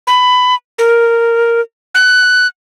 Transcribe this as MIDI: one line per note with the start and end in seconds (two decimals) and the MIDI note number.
0.07 0.55 83
0.78 1.61 70
1.95 2.47 90